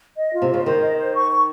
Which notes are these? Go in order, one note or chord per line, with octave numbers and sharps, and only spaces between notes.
D#5
F4
C3
C#3 F4
D#3 C5
D#5
C5
C#6
C#6